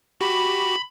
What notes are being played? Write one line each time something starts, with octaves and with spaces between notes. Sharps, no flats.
F#4 G4 B5